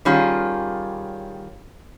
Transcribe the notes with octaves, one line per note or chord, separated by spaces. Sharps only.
D#3 G3 C#4 F4 G#4